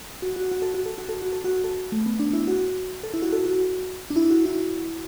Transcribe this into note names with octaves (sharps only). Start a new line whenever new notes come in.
F#4
F#4
F#4
A4
F#4
A4
F#4
A4
F#4
A4
F#4
A4
A3
B3
D4
E4
F#4
A4
E4
F#4
A4
F#4
D4
E4
F#4
E4